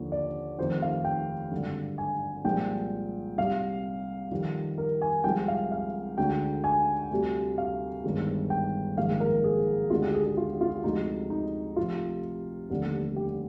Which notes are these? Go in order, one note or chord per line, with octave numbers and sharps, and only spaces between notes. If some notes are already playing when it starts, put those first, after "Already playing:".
Already playing: D#2 D3 F3
D5
F1 F2 D#3 C5
F5
G5
G#1 G2 D3
G#5
C2 A#2 F3 G#3 G5
C2 C3 G3 F5
F2 D#3 G3
A#4
G#5
C2 C3 F3 G#3 G5
F5
F5
D2 D3 G#3 G5
G#5
D2 C3 G3
F5
G1 G2 D#3 G#3
G5
A#1 G#2 D#3 G#3 F5
A#4
G#4
D2 D3 G#3 F4
G4
G#4
G#4
F4
F4
D2 C3 F3 G#3 D#4
D#4
F1 F2 C3 F4
F1 D#2 D3 G3
G4